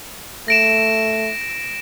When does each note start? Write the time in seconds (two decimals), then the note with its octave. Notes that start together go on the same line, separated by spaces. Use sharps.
0.48 A3 A#6 D7 E7